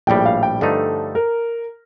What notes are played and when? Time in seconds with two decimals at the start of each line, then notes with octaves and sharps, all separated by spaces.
0.07 A#1 A2 G3 G5
0.25 F5
0.43 G5
0.61 G2 D3 F3 A3 D#4 A4
1.15 A#4